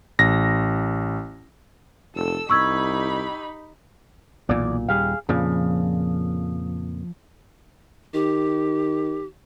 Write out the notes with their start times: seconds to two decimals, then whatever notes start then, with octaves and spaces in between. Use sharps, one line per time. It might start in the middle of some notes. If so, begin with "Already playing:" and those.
0.19 A1 A#6
2.15 F1 A4 E6
2.50 C2 D#4 G4 B5 C#6 E6 G#6
4.49 B1 E2 A#2 D5
4.89 D#1 G3 G#4 F5
5.29 F2 A#2 C#3 F3
8.14 D#3 G4